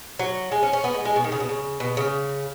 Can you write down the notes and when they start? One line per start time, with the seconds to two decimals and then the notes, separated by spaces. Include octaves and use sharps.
0.19 F#3
0.52 G#3
0.63 C#4
0.73 C#4
0.84 B3
0.94 G#3
1.05 G#3
1.16 B2
1.24 D#3
1.32 C#3
1.40 B2
1.49 C#3
1.80 B2
1.97 C#3